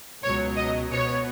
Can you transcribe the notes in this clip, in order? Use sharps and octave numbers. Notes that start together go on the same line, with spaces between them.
C#2 B2 F#3 C#5
D#5
B2 B3 C#5